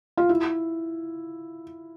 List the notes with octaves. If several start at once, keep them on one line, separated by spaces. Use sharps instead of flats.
F4
E4